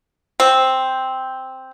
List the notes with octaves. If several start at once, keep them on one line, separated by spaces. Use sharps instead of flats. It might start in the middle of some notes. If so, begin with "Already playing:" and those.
C4